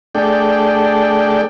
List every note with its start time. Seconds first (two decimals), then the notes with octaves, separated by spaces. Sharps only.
0.15 A3 D4 G#4 A4 D5 G5